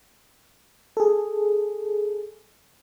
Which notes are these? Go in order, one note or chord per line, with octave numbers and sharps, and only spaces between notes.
G#4 A4